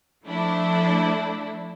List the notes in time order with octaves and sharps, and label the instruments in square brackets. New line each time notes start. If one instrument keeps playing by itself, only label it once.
[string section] F3 A3 D4 E4